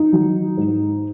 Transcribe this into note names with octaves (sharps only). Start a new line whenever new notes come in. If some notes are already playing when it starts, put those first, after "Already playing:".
Already playing: D#4
D#3 F#3
G#2